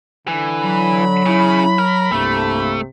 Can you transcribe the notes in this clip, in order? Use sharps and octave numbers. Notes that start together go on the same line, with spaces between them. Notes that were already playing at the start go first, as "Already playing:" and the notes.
D3 E3
F#3 B5
C#3 E4
A#4
C2 G2 C3 A3 A#3